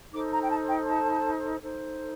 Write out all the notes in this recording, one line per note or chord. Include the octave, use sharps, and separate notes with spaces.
D#4 A4 C5 D6
A#5
G5
A5
G5
A5
D#4 A4 C5